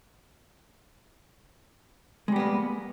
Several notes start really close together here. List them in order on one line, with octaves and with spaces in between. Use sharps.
G#3 G3 B3 A#3